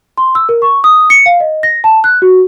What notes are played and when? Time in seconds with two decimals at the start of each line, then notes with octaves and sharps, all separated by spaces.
0.18 C6
0.35 E6
0.49 A#4
0.62 C#6
0.84 D#6
1.10 C#7
1.26 F5
1.40 D#5
1.63 A#6
1.84 A5
2.04 F#6
2.22 F#4